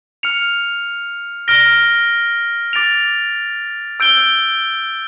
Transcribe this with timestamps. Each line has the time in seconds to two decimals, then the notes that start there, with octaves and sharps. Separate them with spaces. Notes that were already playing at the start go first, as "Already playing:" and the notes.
0.23 F6 C#7 F7
1.48 F6 A#6 D7 G7
2.73 D6 A6 D7 F7
4.00 E6 G6 D7 G7